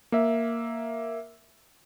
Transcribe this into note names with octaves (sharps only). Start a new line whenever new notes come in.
A#3 E5